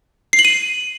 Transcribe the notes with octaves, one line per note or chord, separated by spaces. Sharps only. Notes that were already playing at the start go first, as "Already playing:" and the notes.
C7
F#7
D#7